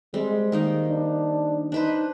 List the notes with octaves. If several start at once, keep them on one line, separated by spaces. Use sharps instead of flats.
G3 G#3 C4
D#3 A#3 D#4
D4
D4 D#4 B4 C5